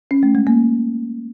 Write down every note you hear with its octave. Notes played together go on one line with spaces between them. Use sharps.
C#4
A3
G#3
A#3